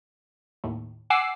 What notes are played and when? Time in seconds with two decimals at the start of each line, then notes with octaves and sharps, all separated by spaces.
0.64 D#2 A2
1.10 F#5 G#5 D6 E6 C7